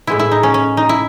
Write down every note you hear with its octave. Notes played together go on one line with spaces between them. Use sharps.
A2 G#3 B3 E4
E4
D#4
C#4
C#4
D#4
E4